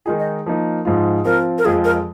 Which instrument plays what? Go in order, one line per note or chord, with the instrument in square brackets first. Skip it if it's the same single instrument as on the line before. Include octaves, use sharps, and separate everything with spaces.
[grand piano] D#3 G#3 D#4 G#4 [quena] F4
[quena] D#5
[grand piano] F3 A#3 D#4
G#2 F3 G#3 F4
[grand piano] F3 C4 F4 [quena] A#4
[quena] A#4
[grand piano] F2 F3 G#3 F4 [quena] G#4
[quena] A#4